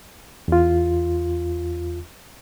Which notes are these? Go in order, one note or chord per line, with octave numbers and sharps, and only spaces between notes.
E2 F4